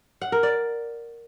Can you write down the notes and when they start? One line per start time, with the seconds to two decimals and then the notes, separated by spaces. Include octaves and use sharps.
0.21 F#5
0.32 A#4
0.43 D5